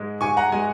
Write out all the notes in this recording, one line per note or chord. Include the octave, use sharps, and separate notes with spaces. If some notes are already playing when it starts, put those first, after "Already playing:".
Already playing: G#2 G#3
G#2 G#5 C#6
F#5 A#5
G#3 G#5